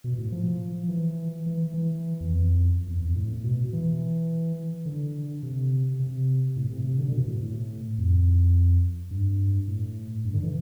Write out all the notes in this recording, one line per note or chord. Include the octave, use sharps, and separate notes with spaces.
B2
A2
F3
E3
E3
E3
E2
F2
E2
F2
A2
B2
E3
D3
C3
C3
A2
C3
C3
D3
C3
B2
A2
A2
F2
G2
A2
G2
D3
E3